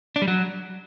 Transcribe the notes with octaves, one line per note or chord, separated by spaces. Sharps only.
D4
G3
F#3